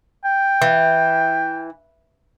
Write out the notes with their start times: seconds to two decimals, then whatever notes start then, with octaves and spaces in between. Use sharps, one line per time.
0.25 G5
0.62 E3